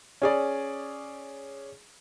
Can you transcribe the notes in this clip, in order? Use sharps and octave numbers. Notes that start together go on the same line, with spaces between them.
C#4 G#4 D5